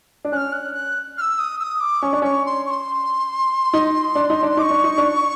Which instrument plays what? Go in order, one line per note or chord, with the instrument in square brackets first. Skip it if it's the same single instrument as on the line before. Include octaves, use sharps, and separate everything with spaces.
[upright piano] D4
[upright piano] C#4 [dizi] F6 F#6
[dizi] F#6
F#6
F6
E6
D#6
E6
D#6
D6
[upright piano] C#4 [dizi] C#6
[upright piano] D4
[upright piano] C#4 [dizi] C#6
[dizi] C6
C#6
C6
[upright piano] D#4
D4
D#4
D4
[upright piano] D#4 [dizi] D6
[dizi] C#6
[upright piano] D4
D#4
D4